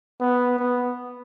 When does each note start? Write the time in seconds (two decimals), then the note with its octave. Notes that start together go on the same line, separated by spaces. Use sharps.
0.20 B3
0.59 B3